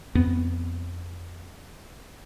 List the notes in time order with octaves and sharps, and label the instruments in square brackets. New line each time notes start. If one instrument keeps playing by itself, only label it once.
[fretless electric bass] F2 B3 C4